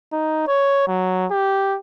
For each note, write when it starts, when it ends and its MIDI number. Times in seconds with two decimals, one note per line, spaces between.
0.13 0.43 63
0.47 0.84 73
0.88 1.26 54
1.31 1.78 67